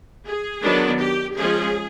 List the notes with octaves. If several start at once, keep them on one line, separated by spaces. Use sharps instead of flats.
G#4
D#3 F#3 B3 D4
G4
F3 G#3 C#4 G#4